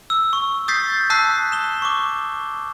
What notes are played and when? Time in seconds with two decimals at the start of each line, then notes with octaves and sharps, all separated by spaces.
0.10 E6
0.33 C#6
0.68 D#6 G6 A6 B6 C7
1.10 A5 D#6 E6 F#6 B6 C7
1.52 E7 G7
1.82 C#6 D6